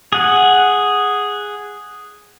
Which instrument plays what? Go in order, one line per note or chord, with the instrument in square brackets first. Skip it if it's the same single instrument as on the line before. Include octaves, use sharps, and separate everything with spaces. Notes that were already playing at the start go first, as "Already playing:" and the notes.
[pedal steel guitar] G#4 F#5